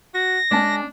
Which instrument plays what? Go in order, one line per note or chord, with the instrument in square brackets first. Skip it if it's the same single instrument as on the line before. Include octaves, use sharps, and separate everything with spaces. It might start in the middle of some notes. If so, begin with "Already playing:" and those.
[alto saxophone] F#4 [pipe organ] A#6
[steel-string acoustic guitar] G#3 C#4 A5 [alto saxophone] D4